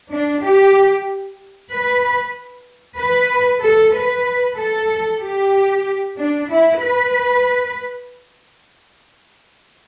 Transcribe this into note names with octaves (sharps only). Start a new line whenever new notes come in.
D4
G4
B4
B4
A4
B4
A4
G4
D4
E4
B4